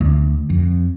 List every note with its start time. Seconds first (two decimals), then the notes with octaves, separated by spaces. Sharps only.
0.01 D2
0.50 F2